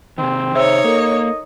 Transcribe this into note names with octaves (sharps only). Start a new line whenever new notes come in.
C3 D#3 C4
C3 D#4 G#4 C5 C#5 E5 E6
A#3 A4 A#4 D#5